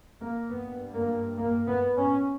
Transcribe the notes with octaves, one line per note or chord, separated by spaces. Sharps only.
A#3
G2 B3
A#3
A#3
B3
C#4